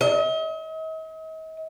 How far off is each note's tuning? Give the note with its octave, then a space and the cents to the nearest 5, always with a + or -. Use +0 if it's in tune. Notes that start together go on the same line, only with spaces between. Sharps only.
D#5 +45